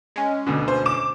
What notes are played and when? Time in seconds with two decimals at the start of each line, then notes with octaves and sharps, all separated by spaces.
0.16 G#3 C#4
0.47 D2 B2 D3
0.68 C5
0.86 D6 E7